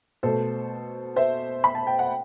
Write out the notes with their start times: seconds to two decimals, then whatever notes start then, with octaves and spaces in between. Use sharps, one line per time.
0.23 B2 A3 A4 C5
1.16 C5 E5
1.64 B5
1.75 A5
1.87 G5
1.99 F#5